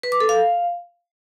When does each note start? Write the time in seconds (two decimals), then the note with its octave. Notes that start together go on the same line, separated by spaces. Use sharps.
0.03 B4
0.12 D6
0.20 A4
0.29 F5